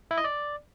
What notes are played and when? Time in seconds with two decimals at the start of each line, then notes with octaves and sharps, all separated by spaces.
0.11 E4
0.18 D#5
0.24 D5